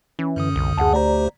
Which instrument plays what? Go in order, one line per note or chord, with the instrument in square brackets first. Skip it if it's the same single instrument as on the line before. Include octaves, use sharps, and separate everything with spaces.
[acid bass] E3 [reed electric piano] C#4
[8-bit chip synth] F#2 D3 D#6
[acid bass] C2
[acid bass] D2 [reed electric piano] G#4 F#5 A5
[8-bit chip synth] A3 G4 C5 [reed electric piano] D5 A#5